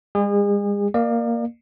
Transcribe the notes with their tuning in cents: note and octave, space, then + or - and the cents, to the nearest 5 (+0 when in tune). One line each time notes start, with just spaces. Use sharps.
G#3 -45 G#4 -35
A#3 +0 D5 +40